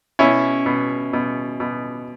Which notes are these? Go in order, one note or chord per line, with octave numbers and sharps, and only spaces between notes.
B2 C#4 E4
B2
B2
B2